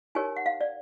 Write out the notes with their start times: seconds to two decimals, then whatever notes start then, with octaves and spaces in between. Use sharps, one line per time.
0.15 D#4 G4 A#4 C#5 G#5
0.36 F#5
0.46 F5
0.61 D5